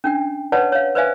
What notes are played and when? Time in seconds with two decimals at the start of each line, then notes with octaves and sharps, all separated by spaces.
0.04 C#4 D4 G5
0.52 B4 C#5 D5 F#5 A5
0.72 C#5 F5
0.95 B4 C5 D5 E5 F5 G#5